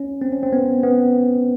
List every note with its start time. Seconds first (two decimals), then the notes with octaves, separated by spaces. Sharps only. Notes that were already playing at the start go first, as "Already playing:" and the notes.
Already playing: C#4
0.22 C4
0.32 C#4
0.43 C4
0.53 B3
0.83 B3